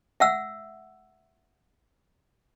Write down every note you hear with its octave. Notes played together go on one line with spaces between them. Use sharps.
E5 F#5 E6